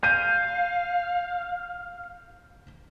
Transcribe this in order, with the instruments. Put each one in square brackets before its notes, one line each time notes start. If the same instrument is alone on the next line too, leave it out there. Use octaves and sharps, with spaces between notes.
[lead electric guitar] F5 [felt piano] G6 D#7